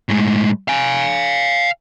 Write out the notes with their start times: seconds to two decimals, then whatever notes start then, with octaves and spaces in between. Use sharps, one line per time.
0.09 A2 G#3
0.68 F5 G#5